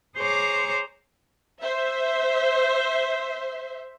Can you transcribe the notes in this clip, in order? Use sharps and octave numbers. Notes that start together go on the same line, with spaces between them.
G#4 C5 C#5 A#5 C#6 D6
C5 E5